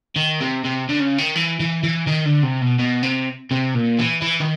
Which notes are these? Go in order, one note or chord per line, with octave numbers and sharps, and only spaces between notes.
D#3
C3
C3
D3
C#3
D#3
E3
E3
E3
D#3
D3
C3
B2
B2
C3
C3
A#2
E3
E3
D#3